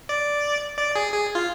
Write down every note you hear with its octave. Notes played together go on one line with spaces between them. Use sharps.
D5
D5
G#4
G#4
F4